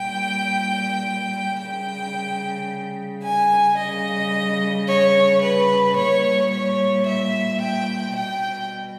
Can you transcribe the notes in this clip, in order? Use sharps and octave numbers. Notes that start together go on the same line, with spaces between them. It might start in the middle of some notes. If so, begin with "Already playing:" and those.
Already playing: A#2 G3 G5
C#3 G3 G5
G#5
C#3 G3 D#5
C#5
B4
A#2 G3 C#5
C#5
E5
G5
B2 G3 G5